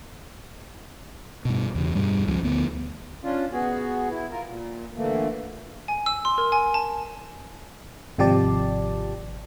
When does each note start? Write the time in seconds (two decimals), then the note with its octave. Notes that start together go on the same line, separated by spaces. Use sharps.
1.45 G2 B2
1.75 E2 C#3
1.95 G2 B2 G3
2.27 C#2 F3 A3 C#4
2.43 D2 B3
3.23 C#4 D4 F4
3.52 B3 F#4 G#4
4.10 E4
4.31 F4 A#4
4.46 A#2
4.96 A#2 D3 E3 A3 A#3
5.88 G#5
6.06 E6
6.25 C6
6.38 A#4
6.52 G#5
6.74 A5
8.18 G#1 C3 F3 G4 D5 A5